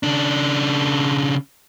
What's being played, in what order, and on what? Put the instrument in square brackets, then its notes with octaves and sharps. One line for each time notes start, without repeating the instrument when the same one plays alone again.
[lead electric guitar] C#3 D4